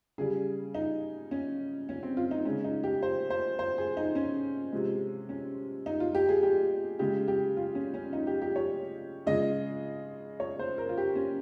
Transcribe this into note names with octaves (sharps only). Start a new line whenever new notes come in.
C#3 G3 G#4
D#4
C#4
C#4
C4
F4
D#4
C#3 G#3 C#4
D#4
G4
C5
C5
C5
G#4
D#4
C#4
C3 F3 G#3
C#4
D#4
F4
G4
G#4
G4
C#3 G#3 G4
G4
F4
C#4
C#4
D#4
G4
G4
C#5
C#3 F3 G#3 D#5
C#5
C5
A#4
F4
G4
C#4